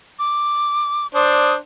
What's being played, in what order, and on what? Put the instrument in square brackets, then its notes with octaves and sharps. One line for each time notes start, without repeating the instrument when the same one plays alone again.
[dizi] D6
[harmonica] D4 C5 [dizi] D#6